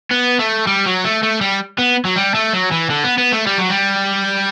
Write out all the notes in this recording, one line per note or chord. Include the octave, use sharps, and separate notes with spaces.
B3
A3
G3
F#3
A3
A3
G3
B3
F#3
G3
A3
F#3
E3
D3
B3
B3
A3
G3
F#3
G3